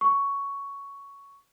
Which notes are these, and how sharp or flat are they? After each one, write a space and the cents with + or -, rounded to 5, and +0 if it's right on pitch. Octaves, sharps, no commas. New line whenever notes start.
C#6 +10